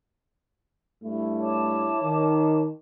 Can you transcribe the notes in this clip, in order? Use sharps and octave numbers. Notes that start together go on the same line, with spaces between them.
G2 A3 E4
C#5 A5 D6
D#3